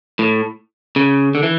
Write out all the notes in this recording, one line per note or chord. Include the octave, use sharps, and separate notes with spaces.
A2
C#3
D3
E3